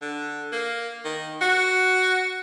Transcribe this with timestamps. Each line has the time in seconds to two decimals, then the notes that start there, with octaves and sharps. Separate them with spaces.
0.02 D3
0.52 A#3
1.05 D#3
1.41 F#4